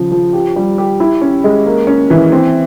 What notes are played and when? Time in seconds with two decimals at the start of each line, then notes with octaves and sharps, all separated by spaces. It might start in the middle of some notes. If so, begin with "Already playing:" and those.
Already playing: C#3 F3
0.12 F3
0.33 G4
0.56 G3
0.78 G4
1.00 E4
1.22 C#4
1.44 G#3
1.66 A#3
1.87 C#4
2.10 E3
2.32 C4